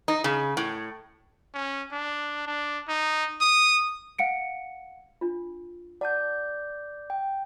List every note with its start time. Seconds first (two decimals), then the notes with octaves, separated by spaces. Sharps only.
0.08 D#4
0.24 C#3
0.57 A2
1.54 C#4
1.92 D4
2.47 D4
2.88 D#4
3.41 D#6
4.19 F5 F#5 C#7 D7
5.21 D4 F4
6.01 D5 F#5 A5 G6
7.10 G5